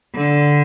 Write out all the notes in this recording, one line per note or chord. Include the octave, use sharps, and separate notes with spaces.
D3